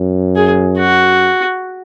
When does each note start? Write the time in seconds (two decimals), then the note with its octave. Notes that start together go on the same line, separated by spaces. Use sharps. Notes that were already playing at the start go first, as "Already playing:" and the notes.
Already playing: F#2
0.36 G#4
0.79 F#4